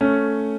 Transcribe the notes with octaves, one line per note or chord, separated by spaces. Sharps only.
A3 C#4